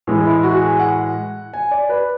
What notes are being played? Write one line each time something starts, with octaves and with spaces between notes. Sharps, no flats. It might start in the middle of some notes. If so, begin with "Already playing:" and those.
A2 E3 G#3 G#4
E4
F#4
G#4
F#5
G#5
D5
B4